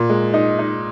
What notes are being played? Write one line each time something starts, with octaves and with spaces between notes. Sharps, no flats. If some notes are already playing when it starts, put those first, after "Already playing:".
Already playing: A#2
G#3
D#4
D#4